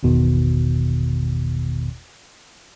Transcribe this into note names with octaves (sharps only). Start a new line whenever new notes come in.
G#1 E2 B2 D#3